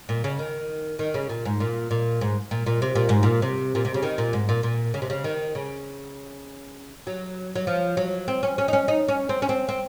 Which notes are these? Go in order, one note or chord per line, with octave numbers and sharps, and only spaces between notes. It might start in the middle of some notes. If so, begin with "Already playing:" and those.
A#2
C#3
D#3
D#3
C#3
A#2
G#2
A#2
A#2
G#2
A#2
A#2
C3
A#2
G#2
A#2
C3
A#2
C3
C#3
D#3
A#2
G#2
A#2
A#2
C#3
C3
C#3
D#3
C#3
F#3
F#3
F3
F#3
C4
C#4
C#4
D#4
C#4
D#4
C#4
C4
C#4
C4
C4